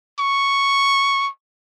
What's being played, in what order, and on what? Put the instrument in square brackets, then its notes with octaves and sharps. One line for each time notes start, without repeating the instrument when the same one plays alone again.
[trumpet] C#6